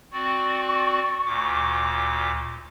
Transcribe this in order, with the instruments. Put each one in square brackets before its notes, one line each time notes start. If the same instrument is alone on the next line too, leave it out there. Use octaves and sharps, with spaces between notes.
[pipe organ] C4 F#4 D5 [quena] C#6
[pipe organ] D2 A#2 D6